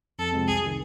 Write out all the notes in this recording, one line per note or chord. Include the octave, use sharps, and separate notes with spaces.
F2 A4
C3 F3 G#3 C4
C2 G#4
C3 D#3